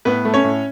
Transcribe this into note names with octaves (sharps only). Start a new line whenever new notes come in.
A2 B3 B4
A3
C#4 C#5
A2